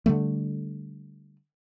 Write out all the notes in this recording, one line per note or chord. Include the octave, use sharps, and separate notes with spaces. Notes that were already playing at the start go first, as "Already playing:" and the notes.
D3 F3 G3 A3